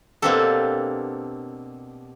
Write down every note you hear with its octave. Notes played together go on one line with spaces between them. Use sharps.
B2 A#3 C4 D4 G4 A4